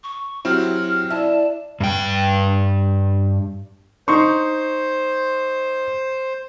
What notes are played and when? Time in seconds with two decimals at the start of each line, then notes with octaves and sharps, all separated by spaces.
0.04 C#6
0.45 F#3 C4 E4 F#4 G4 F6
1.10 D4 E4 E5 A5
1.80 G2 G5
4.08 D#4 C5 C6 C#6